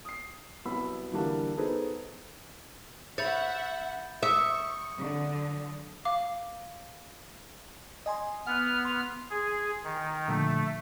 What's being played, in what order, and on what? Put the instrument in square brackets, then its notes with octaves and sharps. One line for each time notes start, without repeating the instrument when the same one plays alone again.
[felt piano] D#6 C7
C2 F#3 B3 B5 E6
D3 E3 G3 A#3 D4
B3 D#4 G#4 A4 B4 C5
[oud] C#5 [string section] E5 F#5 [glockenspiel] B5 G6 A6
[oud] E5 [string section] C#6 [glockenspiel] D#6 C#7
[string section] D3 F#3
[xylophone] F5 D6
[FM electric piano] D#5 G#5 C6
[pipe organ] B3 F6 [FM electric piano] F#5 F#6
[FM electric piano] C6
[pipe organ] G#4
D#3
[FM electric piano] A#2 D3 F3 [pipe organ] A3